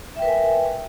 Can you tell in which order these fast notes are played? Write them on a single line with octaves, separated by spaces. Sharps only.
E5 G5 B4 A#4 G#5